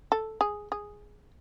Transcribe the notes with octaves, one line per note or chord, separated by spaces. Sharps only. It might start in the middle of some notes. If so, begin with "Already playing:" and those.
A4
G#4
G#4